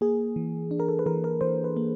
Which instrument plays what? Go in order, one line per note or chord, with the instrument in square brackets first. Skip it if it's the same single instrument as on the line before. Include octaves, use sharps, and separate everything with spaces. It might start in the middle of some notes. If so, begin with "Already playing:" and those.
[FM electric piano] A#3 G#4
E3
D4
A#4
A4
B4
E3 A#4
A#4
E3 C5
B4
A#3